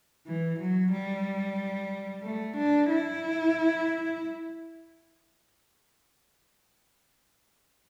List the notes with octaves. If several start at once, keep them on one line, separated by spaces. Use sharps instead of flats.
E3
F#3
G3
A3
D4
E4